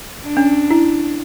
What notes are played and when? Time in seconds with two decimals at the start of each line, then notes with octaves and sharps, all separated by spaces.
0.24 D4
0.37 C#4
0.71 E4